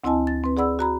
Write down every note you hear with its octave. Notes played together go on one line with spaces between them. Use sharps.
D2 C4 E4 D#5 G#5 A5
A6
C4 B4
G#4 D5 F#5 B5 E6
F#4 A#5 B5